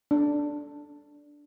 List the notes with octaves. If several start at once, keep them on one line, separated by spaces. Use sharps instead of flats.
D4